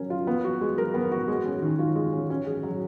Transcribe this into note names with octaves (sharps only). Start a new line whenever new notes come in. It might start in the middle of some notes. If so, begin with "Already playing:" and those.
Already playing: F#3 C#4 A#4
F4
B3
F#4
G#3
A#4
B3
F#4
G#3
C#4
D#3
F4
G#3
C#4
C#4
G#4
F#3